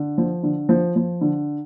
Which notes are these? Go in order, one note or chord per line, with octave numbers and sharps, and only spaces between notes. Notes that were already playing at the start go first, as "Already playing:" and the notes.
Already playing: D3
F3
D3
F3
F3
D3